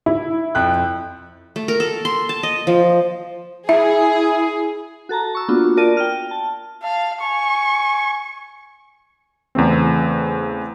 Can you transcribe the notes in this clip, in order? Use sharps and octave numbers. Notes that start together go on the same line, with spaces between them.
E4
F2 G5 F#6
A3
A#4
A4
C6
A5
D#5
F3
E4 G#4 E5
F#4 A4 A5 A#5
C#6 E6
A#3 B3 D4 F4 F#4
F4 A#4 D5 A5 D#7
G5 F6
A5
F5 A5
G#5 C#6
E2 C#3 A3 C4